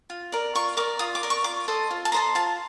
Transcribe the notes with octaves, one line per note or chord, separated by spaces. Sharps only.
F4
A#4 D5
F4 C#6
A#4 D5 D6
F4 D#6
D6
A#4 D5
C#6
F4 D6
A4 C5 D#5
F4
A5
A4 C5 D#5 A#5
F4 A5